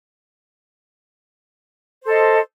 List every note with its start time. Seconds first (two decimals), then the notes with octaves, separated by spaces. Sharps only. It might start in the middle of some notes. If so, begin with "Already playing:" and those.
2.03 C5
2.06 A4
2.09 D#5